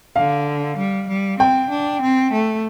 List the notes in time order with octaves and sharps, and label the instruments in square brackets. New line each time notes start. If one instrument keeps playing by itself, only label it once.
[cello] D3 [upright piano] F5
[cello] G3
G3
[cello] C4 [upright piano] G5
[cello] D4
C4
A3